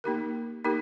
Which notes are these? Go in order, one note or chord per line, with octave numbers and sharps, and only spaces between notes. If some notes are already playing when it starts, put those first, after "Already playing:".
A#3 D#4 G4 A#4
A#3 D#4 G4 A#4